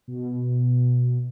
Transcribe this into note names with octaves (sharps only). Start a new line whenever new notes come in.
B2